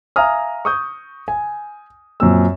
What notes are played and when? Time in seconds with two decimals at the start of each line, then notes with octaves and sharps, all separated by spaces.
0.16 E5 F5 G#5 A#5 D#6 F6
0.65 C#6 D#6 G6
1.28 G#5
2.20 F#2 A#2 C4 E6